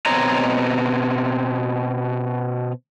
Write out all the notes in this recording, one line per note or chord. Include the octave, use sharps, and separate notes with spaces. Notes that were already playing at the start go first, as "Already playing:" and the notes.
B2 C4 C#5 D#5 A#5